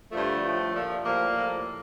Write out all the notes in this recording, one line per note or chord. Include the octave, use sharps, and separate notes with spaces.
G2 D3 F3 A3
A2 F3
A#2 F3
A2 F3 G3 A#3
A2 F3